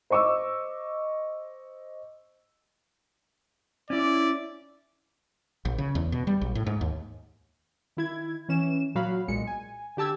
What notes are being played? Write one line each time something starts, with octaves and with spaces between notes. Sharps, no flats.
C5 D#5 C#6 D6 E6
C#4 E4 D5
A#1
C#3
E2
B2
G3
A#1
A2
G#2
D#2
D#3 E4 G#6
E3 C#4 E7
A#2 F#3 F#4 F5 B5
B1 A#2 G#3 C#7
G#5
D3 G4 A5 E6 G#6